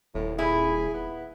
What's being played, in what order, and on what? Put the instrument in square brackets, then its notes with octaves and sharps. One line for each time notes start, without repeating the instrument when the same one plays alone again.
[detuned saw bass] D#1 [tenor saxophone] A2
[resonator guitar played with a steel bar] E4 [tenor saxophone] G#4
[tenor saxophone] B3